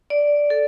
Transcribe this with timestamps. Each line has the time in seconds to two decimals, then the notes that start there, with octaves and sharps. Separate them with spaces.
0.10 D5
0.50 A4